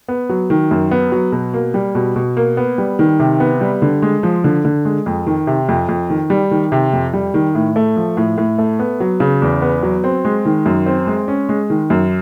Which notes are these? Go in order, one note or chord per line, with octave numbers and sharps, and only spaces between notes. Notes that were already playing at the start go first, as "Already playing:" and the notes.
B3
F#3
D#3
F#2
B3
F#3
B2
A#3
G3
B2
B2
A#3
B3
G3
D#3
C3
B3
G3
D3
G#3
F3
D3
D3
G#3
F2
D#3
C3
F2
F2
D#3
G3
D#3
C3
F2
G3
D#3
A2
A3
F3
A2
A2
A3
B3
F#3
C#3
E2
B3
F#3
C4
G#3
D#3
F#2
C4
G#3
C#4
G#3
D#3
F#2